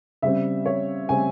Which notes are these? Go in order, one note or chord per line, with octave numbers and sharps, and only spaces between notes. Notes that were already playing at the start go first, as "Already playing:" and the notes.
C#3 G3 C4 E5
C#5
C#3 G3 C4 G#5